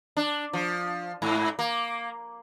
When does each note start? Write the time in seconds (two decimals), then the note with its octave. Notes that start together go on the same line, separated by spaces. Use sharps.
0.17 D4
0.53 F3
1.22 G#2
1.59 A#3